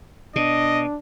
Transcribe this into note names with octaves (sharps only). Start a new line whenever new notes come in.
B2 D4 D#5